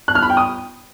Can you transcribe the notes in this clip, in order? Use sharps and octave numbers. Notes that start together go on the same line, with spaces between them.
F#6
F6
B5
G5
D#6